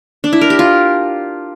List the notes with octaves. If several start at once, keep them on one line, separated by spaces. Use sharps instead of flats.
D4
E4
A#4
G4
F4